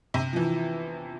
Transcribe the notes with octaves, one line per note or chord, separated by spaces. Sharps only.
C3
F3
E3